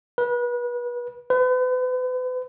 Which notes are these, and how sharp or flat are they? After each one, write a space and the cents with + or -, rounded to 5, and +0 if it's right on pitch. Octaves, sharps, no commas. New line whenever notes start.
B4 -30
B4 +40